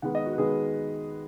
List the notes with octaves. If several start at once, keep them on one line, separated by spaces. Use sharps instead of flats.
D#3 G#3 B3 F#5
D#5
F#4
B4
D#3 G#3 B3 G#4